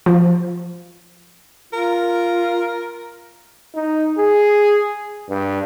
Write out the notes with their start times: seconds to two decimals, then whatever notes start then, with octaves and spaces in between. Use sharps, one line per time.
0.06 F3
1.73 F4 A#4
3.75 D#4
4.19 G#4
5.30 G2